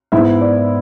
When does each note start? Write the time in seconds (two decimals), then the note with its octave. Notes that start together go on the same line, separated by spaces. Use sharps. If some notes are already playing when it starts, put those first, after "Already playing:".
0.12 G#2 G#3 B3 E4 E5
0.41 D5